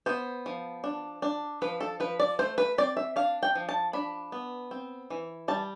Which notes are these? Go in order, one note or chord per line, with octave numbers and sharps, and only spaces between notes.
B3 C5
F3
D4
D4
F3 B4
A4
F3 B4
D5
A3 C5
B4
C4 D5
E5
D4 F5
G5
F3
A5
D4 B5
B3
C4
E3
G3 A5